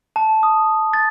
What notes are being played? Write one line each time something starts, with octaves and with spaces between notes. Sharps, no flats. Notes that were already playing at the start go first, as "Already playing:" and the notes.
A5
D#6
A6